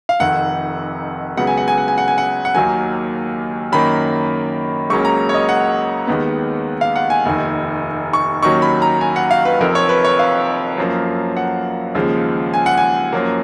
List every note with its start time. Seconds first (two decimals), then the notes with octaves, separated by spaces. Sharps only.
0.09 F5
0.20 F1 F2 D#3 F#5
1.37 C#2 C#3 F#3 B3 F#5
1.47 G#5
1.58 F#5
1.68 G#5
1.78 F#5
1.88 G#5
1.98 F#5
2.08 G#5
2.18 F#5
2.45 F#5
2.55 D#2 D#3 F#3 A#3 G#5
3.72 F#2 D#3 A#3 B5
4.90 C#2 C#3 F#3 A#3 C#4 C#6
5.05 A#5
5.29 C#5
5.34 D#5
5.49 F#5
6.07 D#2 D#3 G#3 B3
6.81 F5
6.96 F#5
7.10 G#5
7.26 F1 D#2 D#3
8.13 C#6
8.43 D#2 D#3 F#3 C#4 C#6
8.62 B5
8.82 A#5
9.01 G#5
9.16 F#5
9.31 F5
9.45 B4
9.60 F1 F2 F3 A#4
9.75 C#5
9.89 B4
10.04 C#5
10.19 F5
10.78 F#2 F3 A#3
11.37 F#5
11.95 D#2 C#3 F3 G#3
12.54 G#5
12.66 F#5
12.78 G#5
13.12 F#2 F3 A#3